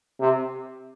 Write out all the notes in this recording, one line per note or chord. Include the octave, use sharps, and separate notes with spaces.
C3